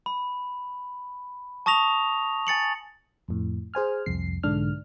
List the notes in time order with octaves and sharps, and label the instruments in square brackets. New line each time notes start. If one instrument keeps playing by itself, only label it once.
[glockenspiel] B5
A5 C#6 D#6 A#6 F7
G#5 A6 C#7 F#7
[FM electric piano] F2 A2
G#4 C5 G#5 F6
C2 F2 C7
B1 G#2 D3 D4 F6